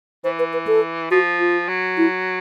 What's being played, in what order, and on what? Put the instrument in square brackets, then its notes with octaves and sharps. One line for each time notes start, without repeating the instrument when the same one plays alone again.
[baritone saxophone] E3 [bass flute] C5
[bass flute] B4
B4
A4
[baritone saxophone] F3 [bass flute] F#4
[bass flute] F4
[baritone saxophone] F#3
[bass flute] E4